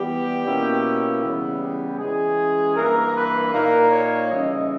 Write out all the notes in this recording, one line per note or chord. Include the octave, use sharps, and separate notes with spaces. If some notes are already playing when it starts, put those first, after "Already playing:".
Already playing: E3 G3 B3 G4
B2 A#3 C#4 E4
C#3 E3 G3 B3 E4
G4
E3 G#3 C#4 G#4
G2 E3 A#3 A#4
B4
A#2 A#3 D#4 A#4
C#5
C#3 E3 G3 C#4 D#5